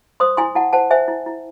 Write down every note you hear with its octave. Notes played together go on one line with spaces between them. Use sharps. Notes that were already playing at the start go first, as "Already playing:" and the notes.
C5 C6 D#6
E4 G#5 C6
E4 F#5 A5
C5 F#5 A5
C5 E5 G#5
E4
E4